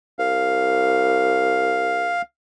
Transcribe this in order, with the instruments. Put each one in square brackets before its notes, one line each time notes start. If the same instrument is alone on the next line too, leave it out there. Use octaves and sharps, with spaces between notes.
[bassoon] C2 [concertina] F5